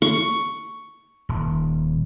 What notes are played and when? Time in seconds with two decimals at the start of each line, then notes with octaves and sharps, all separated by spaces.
0.02 C#6
1.29 D#1